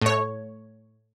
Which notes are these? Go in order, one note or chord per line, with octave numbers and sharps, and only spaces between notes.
A2 C#5